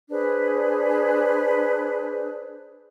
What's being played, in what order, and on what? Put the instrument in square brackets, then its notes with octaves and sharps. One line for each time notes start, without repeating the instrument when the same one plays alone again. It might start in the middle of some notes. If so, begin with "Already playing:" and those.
[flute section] D4 G#4 B4 C5